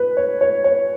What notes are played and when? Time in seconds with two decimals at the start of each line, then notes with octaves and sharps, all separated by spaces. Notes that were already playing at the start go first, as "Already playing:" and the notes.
Already playing: B4
0.17 C#5
0.41 C#5
0.64 C#5